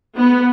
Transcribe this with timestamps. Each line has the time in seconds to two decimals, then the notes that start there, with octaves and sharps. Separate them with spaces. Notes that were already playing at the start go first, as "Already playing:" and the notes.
0.17 B3